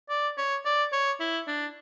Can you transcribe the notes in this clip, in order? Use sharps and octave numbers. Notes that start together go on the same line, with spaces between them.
D5
C#5
D5
C#5
E4
D4